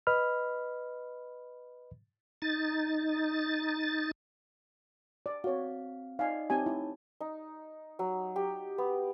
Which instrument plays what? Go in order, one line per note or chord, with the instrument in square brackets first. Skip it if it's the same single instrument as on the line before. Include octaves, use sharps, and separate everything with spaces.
[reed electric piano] B4 D#5 B5 F6
[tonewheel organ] D#4 A6
[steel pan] D5
[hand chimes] C4 F5 [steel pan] F#4 C#5
[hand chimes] D#4 D5 D#5 [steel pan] F5 G#5
[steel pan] C4 G4 G#5 [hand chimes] D#4 C#5 A5
[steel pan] E4
[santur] D#4
F#3
G4
B3